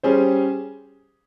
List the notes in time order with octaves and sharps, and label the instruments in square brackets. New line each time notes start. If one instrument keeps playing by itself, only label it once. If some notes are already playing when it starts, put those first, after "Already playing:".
[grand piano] G3 C#4 G#4 C5